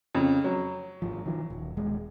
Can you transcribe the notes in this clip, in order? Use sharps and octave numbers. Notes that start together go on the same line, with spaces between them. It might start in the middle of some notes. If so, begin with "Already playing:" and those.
F2 C#3
F#3
G#1 F3
D#3 F3
D#1
D#1 G#3